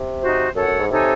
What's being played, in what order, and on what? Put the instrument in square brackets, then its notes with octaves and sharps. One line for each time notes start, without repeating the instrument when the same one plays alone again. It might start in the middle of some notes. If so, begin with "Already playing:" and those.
Already playing: [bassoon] C3
[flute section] D#4 F#4 C5
[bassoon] F#2 [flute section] A4 C#5 F#5
[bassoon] F#2
G#2
[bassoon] C3 [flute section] D#4 A4 C#5 G#5